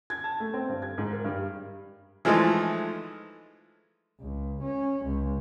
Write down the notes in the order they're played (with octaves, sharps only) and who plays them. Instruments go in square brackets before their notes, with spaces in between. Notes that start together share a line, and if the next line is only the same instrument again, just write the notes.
[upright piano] G#6
A5
A3
C4
G2
G#6
G#2
A#4
G2
[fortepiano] E3 F3 G#3 A3 D#4
[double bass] C#2
C#4
C#2